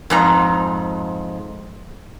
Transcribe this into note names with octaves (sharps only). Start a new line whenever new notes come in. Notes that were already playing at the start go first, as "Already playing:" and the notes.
F2 G#2 A#5